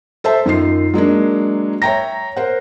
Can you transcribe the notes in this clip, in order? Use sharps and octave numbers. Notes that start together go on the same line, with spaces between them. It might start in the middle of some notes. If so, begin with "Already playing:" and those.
A4 C5 E5 A5
F#2 D#3 D#4 F4 C7
F#3 G#3 A#3 D4
C#5 E5 G5 A#5 A#6
A#4 C5 F#5